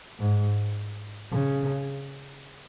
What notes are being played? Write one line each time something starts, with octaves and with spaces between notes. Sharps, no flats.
G#2
C#3